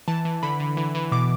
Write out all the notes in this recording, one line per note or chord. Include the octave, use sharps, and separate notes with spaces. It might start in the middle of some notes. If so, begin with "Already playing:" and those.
E3 A5
E3
D3 B5
D3
E3
E3
B2 D6